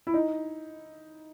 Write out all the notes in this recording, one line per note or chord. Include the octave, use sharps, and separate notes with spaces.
E4
D#4